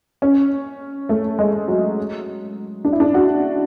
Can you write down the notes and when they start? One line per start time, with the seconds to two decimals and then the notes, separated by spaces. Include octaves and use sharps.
0.22 C#4
1.09 A3
1.39 G#3
1.68 F#3
2.85 D4
2.92 E4
3.00 D4
3.14 F#4